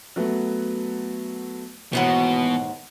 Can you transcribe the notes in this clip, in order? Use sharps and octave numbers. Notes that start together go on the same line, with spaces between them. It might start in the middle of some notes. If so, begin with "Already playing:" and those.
F#3 A3 B3
D#2 G#2 B2 E3 F#5